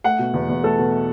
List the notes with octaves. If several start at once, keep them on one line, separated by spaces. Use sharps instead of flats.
A3 F#5
B2
E2
E2
A3 A4
B2